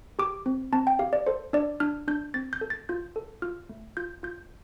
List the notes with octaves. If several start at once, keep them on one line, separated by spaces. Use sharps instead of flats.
G4 D6
C4
C4 A5
G5
G4 F5
D5
A4 C5
D4 D5
D4 F6
D4 G6
C4 A6
G6
A4
A6
F4 G6
A4
F4 F6
A3
F4 G6
F4 G6